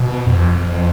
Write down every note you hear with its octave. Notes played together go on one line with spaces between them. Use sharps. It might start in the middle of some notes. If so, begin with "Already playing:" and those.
Already playing: B2
F2